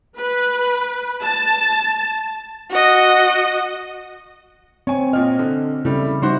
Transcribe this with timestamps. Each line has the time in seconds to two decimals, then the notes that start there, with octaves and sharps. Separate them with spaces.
0.17 B4
1.23 A5
2.70 F#4 D#5
4.87 C4 C#5 G#5
5.13 A#2 D#5 F6
5.39 D3
5.85 C#3 G3 A3 E4
6.22 G3 D#4 E4 F#4 C5 C6